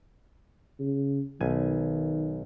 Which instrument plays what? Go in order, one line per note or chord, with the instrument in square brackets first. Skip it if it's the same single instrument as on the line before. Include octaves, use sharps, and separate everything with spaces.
[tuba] C#3
[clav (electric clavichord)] B1 G#5 [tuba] D#3